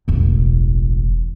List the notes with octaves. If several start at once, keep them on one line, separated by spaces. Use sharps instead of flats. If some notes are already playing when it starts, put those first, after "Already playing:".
E1 A1